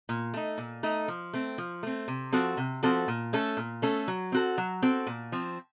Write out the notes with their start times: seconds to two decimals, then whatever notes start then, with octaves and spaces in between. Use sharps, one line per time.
0.09 A#2
0.34 A3 D#4
0.58 A#2
0.83 A3 D#4
1.08 F3
1.33 A3 C4
1.58 F3
1.83 A3 C4
2.08 C3
2.32 F3 C4 F#4 A4
2.57 C3
2.83 F3 C4 F#4 A4
3.08 A#2
3.33 A3 C#4 A4
3.57 A#2
3.82 A3 C#4 A4
4.08 F#3
4.32 C4 F#4 A4
4.58 F#3
4.82 C4 F#4 A4
5.07 A#2
5.32 F3 C4